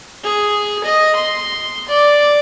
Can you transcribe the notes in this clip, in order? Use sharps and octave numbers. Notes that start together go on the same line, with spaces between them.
G#4
D#5
C6
D5